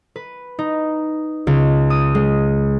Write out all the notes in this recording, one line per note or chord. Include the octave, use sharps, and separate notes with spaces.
B4
D#4
C#2
D#6
G#3